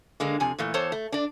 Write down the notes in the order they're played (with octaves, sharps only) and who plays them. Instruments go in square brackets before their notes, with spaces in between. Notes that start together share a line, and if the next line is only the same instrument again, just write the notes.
[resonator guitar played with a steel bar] D3 G#3 A#3
F2 C3 G#5
A#2 E3 A3
E2 A4 C5 C#5 A5
A3
D4 D5